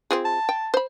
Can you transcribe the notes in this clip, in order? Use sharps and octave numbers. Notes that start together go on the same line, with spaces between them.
C4 F4 G#4
A5
G5
C5 B5